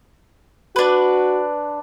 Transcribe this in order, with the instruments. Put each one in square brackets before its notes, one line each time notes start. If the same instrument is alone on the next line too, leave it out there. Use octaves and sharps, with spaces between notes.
[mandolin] D4 B4 [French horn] F#4